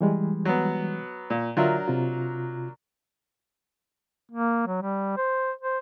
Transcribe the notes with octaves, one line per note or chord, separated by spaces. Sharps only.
E3 G3 G#3
F#3 B3
A#2
D3 F#3 D4 F4 A#4 E5
C3 F4
A#3
F#3
G3
C5
C5